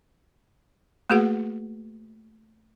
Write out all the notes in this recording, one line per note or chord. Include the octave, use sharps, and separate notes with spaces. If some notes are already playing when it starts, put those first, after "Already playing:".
A3 A#3 F#4 G#4 B4 F#5